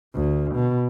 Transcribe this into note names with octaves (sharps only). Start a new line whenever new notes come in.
D2
B2